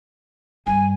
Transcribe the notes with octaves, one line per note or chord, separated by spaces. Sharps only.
G2 G#5